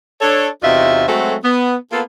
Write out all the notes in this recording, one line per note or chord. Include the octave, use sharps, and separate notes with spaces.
D4 A4 C#5
E2 C3 D#4 F4 F#4 E5
F#3 G#3 A3 C4 F#4 A4
B3
A#3 B3 F4 A4